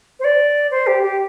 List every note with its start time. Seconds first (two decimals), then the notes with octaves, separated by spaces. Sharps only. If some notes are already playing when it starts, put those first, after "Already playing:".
0.20 C5
0.25 D5
0.71 C5
0.87 G4
1.03 G4